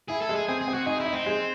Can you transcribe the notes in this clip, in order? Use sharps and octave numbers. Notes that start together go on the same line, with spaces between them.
E4 G#4
A4
G#3
G#4
C4 G#4
G#4
C4
F#4
D#4 G#4
E4
D#4
C4
G#3